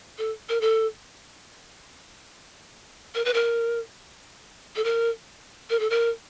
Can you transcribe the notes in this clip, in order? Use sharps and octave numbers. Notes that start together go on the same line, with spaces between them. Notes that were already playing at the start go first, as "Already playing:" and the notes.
A4
A#4
A4
A#4
B4
A#4
A4
A#4
A#4
A4
A#4